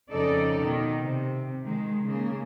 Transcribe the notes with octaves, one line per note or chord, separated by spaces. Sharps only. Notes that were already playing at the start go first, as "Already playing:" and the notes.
F2 C#3 D#4 A4 D5
B2 D#3
C3
D#3 G#3
C#3 A#3